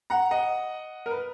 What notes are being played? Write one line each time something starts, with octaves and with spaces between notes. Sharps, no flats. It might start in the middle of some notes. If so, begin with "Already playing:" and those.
F#5 A#5
D#5 F#5
A#4
B4